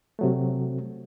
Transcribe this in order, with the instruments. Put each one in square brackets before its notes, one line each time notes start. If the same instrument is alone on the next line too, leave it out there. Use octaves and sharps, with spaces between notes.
[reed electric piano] C3 F#3 A3